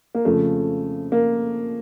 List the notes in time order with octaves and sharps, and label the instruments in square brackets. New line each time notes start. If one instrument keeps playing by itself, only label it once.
[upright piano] A#3
F2 C#3 F3 A3
A#3